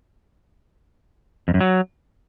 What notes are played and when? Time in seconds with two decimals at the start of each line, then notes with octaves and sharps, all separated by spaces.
1.48 F2
1.54 F#2
1.61 F#3